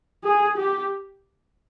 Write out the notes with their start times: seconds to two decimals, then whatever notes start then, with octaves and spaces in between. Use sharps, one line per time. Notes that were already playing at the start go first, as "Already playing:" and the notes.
0.24 G#4
0.58 G4